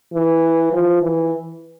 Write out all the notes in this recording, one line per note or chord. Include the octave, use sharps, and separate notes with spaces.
E3
F3
E3